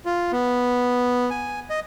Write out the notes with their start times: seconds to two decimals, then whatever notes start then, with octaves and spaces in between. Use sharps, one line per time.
0.06 F4
0.32 B3
1.31 G#5
1.70 D#5